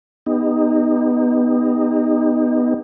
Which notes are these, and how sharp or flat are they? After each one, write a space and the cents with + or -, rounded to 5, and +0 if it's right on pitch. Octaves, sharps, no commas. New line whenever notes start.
B3 +0 D#4 -10 G4 +30